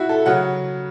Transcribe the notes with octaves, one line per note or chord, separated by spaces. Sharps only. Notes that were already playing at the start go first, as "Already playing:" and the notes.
Already playing: E4 F#4
A4
C#3 F#3 F#5